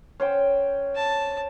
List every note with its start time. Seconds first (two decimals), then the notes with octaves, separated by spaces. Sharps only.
0.20 C#4 C5 G5
0.95 A5